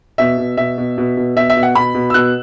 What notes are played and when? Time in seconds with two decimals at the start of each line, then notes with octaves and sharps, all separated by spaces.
0.18 B2 E5
0.38 B2
0.57 B2 E5
0.78 B2
0.98 B2
1.17 B2
1.36 B2 E5
1.50 E5
1.57 B2
1.63 F#5
1.75 B2 B5
1.95 B2
2.10 E6
2.14 B2 F#6